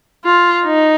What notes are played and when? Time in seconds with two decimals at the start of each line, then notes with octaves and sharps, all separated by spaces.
0.25 F4
0.65 D#4